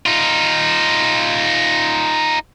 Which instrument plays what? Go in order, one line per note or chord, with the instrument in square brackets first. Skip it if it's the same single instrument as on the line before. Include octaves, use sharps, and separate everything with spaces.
[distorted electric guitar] D#4 F4